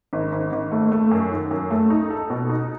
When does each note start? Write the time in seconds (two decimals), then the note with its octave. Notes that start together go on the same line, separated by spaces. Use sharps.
0.13 G#1
0.32 G#1
0.52 G#1
0.72 A3
0.92 A3
1.11 F#2
1.31 D#3
1.51 F#2
1.71 A3
1.90 D#4
2.10 A4
2.30 B2
2.50 D#4